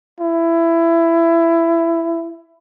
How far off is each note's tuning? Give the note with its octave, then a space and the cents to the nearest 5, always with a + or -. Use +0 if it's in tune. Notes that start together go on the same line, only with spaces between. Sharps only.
E4 +20